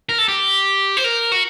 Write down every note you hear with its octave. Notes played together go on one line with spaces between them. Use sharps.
A#4
A4
G4
C5
A#4
F#4